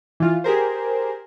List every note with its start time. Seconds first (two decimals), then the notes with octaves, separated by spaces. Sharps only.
0.20 E3 F4
0.44 G4 G#4 A#4 C5